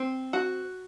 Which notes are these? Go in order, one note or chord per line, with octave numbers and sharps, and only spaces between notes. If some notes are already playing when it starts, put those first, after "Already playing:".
Already playing: C4
F#4